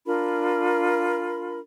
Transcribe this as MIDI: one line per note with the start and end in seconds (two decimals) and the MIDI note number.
0.06 1.60 62
0.06 1.60 65
0.06 1.60 70
0.06 1.60 83